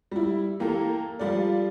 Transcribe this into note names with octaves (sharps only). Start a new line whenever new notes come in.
G3 E4
E3 A#3 G4 A4 A#5
F3 G3 F4 A4 D5